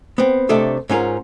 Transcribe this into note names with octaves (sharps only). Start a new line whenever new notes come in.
B3 C4
C3 A3 D4 A4 D#5
G#2 C#4 F4 A#4